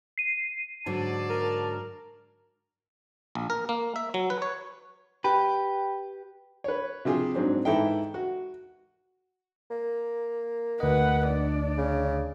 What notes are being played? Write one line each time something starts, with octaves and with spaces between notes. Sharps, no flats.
C7 D#7
G#2 D3 F#3 D5 A5
A#4
A#1
A#4
A#3
E5
F#3
B4
C#5
G4 B4
B4 C#5
C3 F3 F4 G#4
G#2 F#3 C4 D4
G#2 E3 E4 A4 E5 G5
F#4
A#3
D2 B4 D#5 F#5
D4 D5
C#3